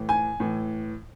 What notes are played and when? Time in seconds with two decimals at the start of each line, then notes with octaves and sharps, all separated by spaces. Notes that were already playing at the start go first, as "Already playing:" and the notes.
Already playing: A2 E3
0.09 G#5
0.40 A2 E3